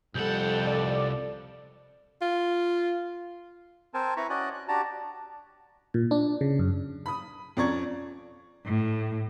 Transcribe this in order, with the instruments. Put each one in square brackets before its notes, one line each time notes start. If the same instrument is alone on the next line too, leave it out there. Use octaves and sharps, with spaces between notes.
[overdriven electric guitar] C2 F#5 [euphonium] F2 [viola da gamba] G3 A4 [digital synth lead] G6
[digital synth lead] D5
[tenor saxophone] F4
[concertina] C4 A#4 C5 G#5 A5
E4 B4 A#5 B5 C#6
C#4 F#4 D5 D#5 G#5 F#6
F#6
D4 F#4 G4 D5 A5 A#5
[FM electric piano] A#2
D4
C#3
F#2
[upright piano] B5 D#6
F2 C#4 D5 A#5 C#6 G#6
[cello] A2